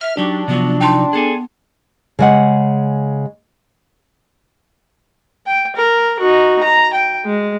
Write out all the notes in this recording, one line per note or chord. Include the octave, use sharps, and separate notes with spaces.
E5 F6
F#3 D4 D#4 G4
C3 F3 F#3 B3
D#4 G5 A5 C6
B3 G#4 A4 G#5
C#3 G#3 F#5
G5
A#4
D#4 F#4
A#5
G5
G#3